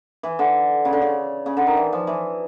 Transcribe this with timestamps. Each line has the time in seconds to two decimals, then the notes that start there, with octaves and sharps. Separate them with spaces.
0.23 E3
0.39 D3
0.85 C#3
0.93 D3
1.02 C#3
1.46 C#3
1.57 D3
1.67 D#3
1.77 E3
1.93 F3
2.07 E3